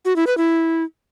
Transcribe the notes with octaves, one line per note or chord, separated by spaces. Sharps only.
F#4
E4
B4
E4